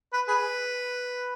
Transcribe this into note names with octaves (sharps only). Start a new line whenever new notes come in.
B4
G#4 B4